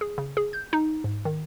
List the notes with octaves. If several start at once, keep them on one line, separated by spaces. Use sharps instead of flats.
G#4
C#3
G#4
G6
D#4
G#2
D#3